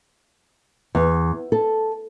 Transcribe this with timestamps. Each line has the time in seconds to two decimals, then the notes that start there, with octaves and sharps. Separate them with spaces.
0.95 E2
1.52 A4